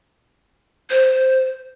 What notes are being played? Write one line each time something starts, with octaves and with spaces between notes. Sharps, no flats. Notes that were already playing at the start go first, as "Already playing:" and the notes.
C5